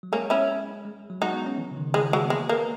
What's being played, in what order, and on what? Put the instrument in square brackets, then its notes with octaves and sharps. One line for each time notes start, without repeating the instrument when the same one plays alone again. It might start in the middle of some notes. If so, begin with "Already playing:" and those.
[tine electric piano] F#3
[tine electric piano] G#3 [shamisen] A#3 C#4
[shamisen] C#4 E4
[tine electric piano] G#3
F#3
[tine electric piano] G#3 [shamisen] D#4 F#4
[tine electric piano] B3
C#4
E3
C#3
D#3
[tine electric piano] E3 [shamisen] G#3
[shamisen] F#3 [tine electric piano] G#3
[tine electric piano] B3
[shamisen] G#3 [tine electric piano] A#3
[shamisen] A#3 [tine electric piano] B4
[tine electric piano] A#4